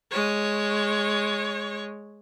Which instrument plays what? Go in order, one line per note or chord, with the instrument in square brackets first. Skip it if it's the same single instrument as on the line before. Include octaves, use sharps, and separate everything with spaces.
[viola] G#3 C#5